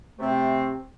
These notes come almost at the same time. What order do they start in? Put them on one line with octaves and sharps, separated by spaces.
A3 C3 C4